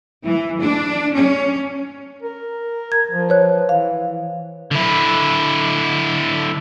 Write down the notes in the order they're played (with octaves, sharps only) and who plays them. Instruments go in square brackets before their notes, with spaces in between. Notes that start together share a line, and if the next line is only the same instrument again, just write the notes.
[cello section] E3
D4
C#4
[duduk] A#4
[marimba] G#6
[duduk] F3
[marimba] B4 C#5 F#6
[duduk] E3 [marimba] F5
[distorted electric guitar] D3 E4